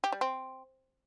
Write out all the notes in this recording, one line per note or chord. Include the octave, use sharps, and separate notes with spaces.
G4
G3
C4